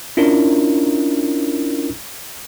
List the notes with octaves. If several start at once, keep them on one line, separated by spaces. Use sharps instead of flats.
C#4 D4 E4 F4 A#4